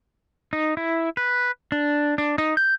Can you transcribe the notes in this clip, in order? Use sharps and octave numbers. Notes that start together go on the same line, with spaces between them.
D#4
E4
B4
D4
D4
D#4
G6